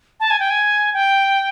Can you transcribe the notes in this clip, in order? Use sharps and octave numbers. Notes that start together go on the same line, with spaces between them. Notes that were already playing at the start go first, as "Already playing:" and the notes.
A5
G#5
G5
G#5
G5